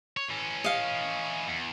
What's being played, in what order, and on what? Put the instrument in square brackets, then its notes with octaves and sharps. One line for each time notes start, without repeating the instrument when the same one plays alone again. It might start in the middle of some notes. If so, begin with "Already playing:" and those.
[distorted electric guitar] C#5
E3 C#4
[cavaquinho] D#5 F5
[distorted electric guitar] E2